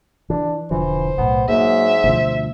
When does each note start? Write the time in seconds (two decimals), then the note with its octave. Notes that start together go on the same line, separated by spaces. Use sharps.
0.30 E3 D4
0.71 E1 D3 E3 F3 C5
1.18 B1 A2 B3
1.49 G#2 F#3 A#3 E5
2.04 D2 B2 F3 C5